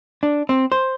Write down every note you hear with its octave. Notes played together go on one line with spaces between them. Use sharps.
D4
C4
C5